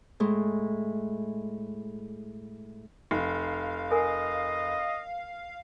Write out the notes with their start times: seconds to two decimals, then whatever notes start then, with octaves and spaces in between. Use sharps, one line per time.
0.20 A2 G#3
3.11 F1 F5
3.92 A#4 D#5 G#5